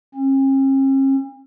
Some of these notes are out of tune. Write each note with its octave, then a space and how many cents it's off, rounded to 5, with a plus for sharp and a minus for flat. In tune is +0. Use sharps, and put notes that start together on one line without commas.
C#4 -45